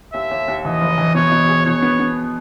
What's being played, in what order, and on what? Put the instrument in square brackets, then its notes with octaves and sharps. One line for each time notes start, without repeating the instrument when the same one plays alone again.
[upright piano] D#2 [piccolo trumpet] E5
[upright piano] D#2
D#2
[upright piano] E3 [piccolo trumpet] D#5
[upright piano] F#1
E3
[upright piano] B2 [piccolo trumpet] C#5
[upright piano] B2
G#4
[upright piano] B2 [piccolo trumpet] C#5
[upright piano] B3
B3